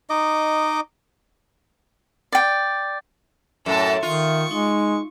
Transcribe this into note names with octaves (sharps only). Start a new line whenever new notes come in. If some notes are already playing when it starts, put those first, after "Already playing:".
D#4 D#5 D6
D5 G5
F#2 A2 A4 E5 A5
D#3 F4 C#6
G#3 D#4